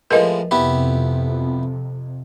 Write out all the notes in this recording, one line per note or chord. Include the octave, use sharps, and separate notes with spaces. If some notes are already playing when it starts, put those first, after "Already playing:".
A2 F3 G#3 A#4 B4 D#5
F2 C3 B3 E4 G4